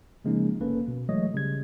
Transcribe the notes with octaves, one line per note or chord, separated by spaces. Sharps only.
C#3 F3 G#3 A#3 C#4 D#4
G1 A#3 C#4 A4 B4
B2
E3 F#3 G#3 A3 C#5 D#5
C#3 G3 G#6